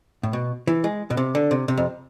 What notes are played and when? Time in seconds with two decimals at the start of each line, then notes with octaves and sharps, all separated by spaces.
0.23 A2
0.33 B2
0.67 E3
0.84 G#3
1.10 B2
1.17 C3
1.35 D3
1.51 C3
1.68 C3
1.77 F2